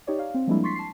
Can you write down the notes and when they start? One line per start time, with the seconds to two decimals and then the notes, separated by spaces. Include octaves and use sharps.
0.07 D#4 G4 C#5 D5
0.19 F5
0.34 C4
0.47 F3 G3 G#3 A#3 D4 E4
0.64 C6 C#6 A6 B6 C7
0.75 A5 C7